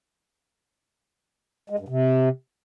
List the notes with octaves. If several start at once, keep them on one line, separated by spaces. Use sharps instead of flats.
G#3
G2
C3